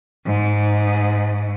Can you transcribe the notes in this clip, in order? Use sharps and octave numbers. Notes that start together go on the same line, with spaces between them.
G#2